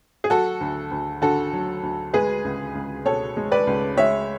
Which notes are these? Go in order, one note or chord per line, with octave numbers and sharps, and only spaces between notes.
G#4
F#3 F#4 A4
D2
D2
D3 F#4 A4
F#3
D2
G#3 G#4 B4
C#2
C#2
B2 A4 C#5
G#3
B4 D5
C#2
G#3 C#5 E5